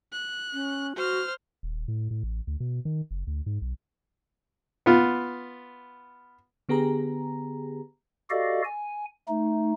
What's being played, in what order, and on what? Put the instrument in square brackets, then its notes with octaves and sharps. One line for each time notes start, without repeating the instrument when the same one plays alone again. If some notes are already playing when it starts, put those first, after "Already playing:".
[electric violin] F#6
[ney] C#4
[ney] F#4 [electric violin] C5 F6
[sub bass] D#1
A2
A2
A1
D2
B2
D#3
F#1
D2
G#2
B1
[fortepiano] B3 F4
[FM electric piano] D3 B3 G4 G#4 A#5
[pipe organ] F#4 G4 A4 D5 D#5 F5
G#5
A3 D#4